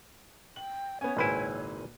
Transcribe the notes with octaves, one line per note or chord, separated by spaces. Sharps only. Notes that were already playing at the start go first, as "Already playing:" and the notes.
G5 F#7
B3 C#4 C#5 G#5
G#1 C#2 A#2 E4 B4 C5 G#5 D#7